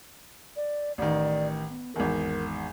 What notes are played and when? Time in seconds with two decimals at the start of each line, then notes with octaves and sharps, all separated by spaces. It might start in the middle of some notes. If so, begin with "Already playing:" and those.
0.56 D5
0.98 A1 D#3 D5
1.70 B3
1.96 G#1 E2 A#4